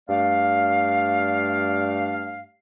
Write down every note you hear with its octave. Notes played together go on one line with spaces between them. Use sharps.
G2 A3 D5 F5